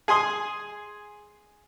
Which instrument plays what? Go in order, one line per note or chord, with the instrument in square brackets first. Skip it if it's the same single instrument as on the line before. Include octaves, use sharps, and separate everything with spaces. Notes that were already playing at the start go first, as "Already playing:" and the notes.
[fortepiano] G#4 G#5 C6 D#6